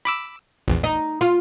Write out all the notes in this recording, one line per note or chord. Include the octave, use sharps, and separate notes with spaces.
B5 D6 E6
A#1 E2
D#4
F4